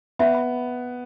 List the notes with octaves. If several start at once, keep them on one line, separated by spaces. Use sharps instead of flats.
B3 E5
B5